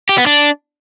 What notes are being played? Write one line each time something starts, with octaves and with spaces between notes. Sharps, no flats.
G4
B3
D4